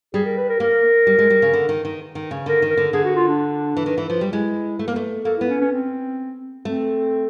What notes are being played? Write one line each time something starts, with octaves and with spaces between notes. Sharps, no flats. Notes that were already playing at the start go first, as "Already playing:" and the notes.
G3 G#4
A#4
B4
A#4
A#3 A#4
G3
G#3
G3
C#3
D3
D#3
D#3
D#3
C#3
D3 A#4
D#3
A#4
D3
D3 G#4
F#4
F4
D4
E3
D#3
E3
F3
G3
G#3 E4
A3
A#3
A3
A#3 A4
E4
B3
C#4
C#4
C4
A3 C4